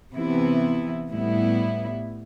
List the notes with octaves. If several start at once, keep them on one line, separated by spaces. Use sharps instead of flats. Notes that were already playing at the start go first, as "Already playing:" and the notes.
C3 E3 B3 E4
A2 G3 B3 E4